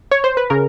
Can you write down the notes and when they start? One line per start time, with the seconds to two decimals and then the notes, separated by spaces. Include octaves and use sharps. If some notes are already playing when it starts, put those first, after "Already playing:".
0.11 C#5
0.24 C5
0.37 B4
0.50 C#3 A#4